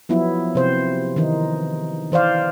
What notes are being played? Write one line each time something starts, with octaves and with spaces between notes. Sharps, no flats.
F3 F#3 B3 E4
C3 C5
D#3 E3 D#4
E3 C5 D5 F5